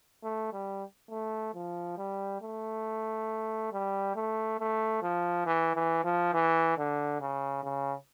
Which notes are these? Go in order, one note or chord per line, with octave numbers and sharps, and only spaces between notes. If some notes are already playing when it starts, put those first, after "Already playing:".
A3
G3
A3
F3
G3
A3
G3
A3
A3
F3
E3
E3
F3
E3
D3
C#3
C#3